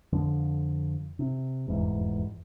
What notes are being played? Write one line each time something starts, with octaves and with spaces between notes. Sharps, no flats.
F2 D3 F3
C3
F1 E2 G#2